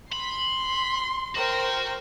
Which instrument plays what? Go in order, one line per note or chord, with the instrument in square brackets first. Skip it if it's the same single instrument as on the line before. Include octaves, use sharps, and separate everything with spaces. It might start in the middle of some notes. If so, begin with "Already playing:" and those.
[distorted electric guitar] B5 [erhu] C6
[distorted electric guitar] F#4 [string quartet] A#4 C5 G5